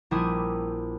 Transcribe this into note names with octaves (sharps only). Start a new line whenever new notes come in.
A#1 G3 E4 G4 D#6 G#6